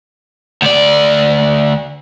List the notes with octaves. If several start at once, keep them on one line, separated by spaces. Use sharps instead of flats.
D2 D5